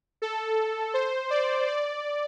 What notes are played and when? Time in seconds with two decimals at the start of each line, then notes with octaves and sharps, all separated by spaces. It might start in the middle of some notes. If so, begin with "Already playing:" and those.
0.22 A4
0.94 C5
1.30 D5
1.67 D5